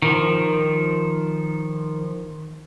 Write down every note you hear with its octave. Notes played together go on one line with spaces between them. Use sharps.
D#3 F3